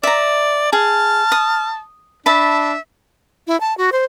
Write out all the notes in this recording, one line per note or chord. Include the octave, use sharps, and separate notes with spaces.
D5 E5 A#5
G#4 A5 F6
D#6
D4 E5 A5 B5
E4
A5
F#4
C5